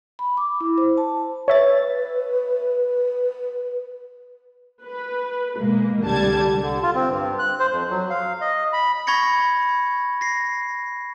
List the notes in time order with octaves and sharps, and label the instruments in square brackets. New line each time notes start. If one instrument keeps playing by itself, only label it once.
[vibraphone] B5
D6
E4
C5
A5
[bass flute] B4 [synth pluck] C#5 E5 A6
[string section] B4
B2 G#3 A#3
C2 D3 G3 A5 G#6
[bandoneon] D3
F4
C4
G2
F#6
C5
F2
F#3
F5
D#5
B5
[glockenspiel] B5 C#6 G#6 A#6 C#7
A#6 C7